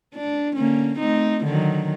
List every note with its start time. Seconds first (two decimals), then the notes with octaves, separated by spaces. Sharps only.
0.15 D4
0.56 D3 A#3 C#4
0.99 A3 C4 D#4
1.45 D3 D#3 F#3